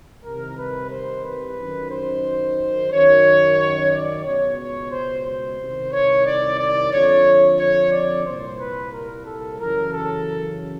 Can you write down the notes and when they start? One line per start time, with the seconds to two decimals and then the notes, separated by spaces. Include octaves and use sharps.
0.24 C2 C3 D#3 A#4
0.57 B4
0.91 C5
1.24 B4
1.57 F#2 D#3
1.91 C5
2.91 F#2 D#3 C#5
3.58 C#5
3.92 D5
4.25 C#2 B2 C#5
4.59 C#5
4.91 C5
5.25 C5
5.58 C2 C3 D#3
5.92 C#5
6.26 D5
6.59 D5
6.92 F2 D3 C#5
7.59 C#5
7.92 D5
8.26 C2 A#2 C5
8.60 B4
8.93 A#4
9.26 A4
9.60 F#2 C#3 E3 A#4
9.93 A4